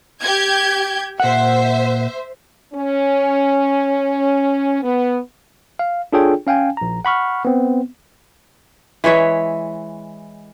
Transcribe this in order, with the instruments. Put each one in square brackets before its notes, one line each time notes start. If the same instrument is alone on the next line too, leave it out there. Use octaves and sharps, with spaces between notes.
[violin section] G4 G6 G#6
[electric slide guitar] A#2 F#5 [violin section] C5 E5
[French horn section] C#4
B3
[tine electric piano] F5
D4 F4 G#4 A4 C#5 G5
C#4 F5 G5 G#5
A#1 A#5
F#5 B5 C#6 F6
B3 C4
[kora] E3 G#3 C#5 E5